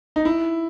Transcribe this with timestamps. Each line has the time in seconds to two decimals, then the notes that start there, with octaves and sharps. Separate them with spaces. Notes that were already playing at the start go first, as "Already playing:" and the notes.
0.16 D#4
0.25 E4